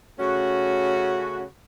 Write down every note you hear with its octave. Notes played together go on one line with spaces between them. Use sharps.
C#3 A3 C#4 F#4